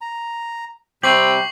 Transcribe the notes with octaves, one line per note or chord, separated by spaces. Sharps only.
A#5
C3 G3 C4 G4 C#6 C7 F#7